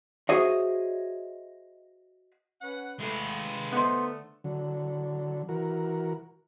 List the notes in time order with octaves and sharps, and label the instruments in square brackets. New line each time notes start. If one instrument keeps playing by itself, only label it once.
[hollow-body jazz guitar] F#4 G#4 C5 C#5 D#5 E5
[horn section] C#4 B4 F#5
[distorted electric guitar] G#3 B4 [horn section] A3
[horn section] D3 A3 [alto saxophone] B3 [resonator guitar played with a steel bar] D#4 C5
[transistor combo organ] D3 F#3
E3 F#4 A#4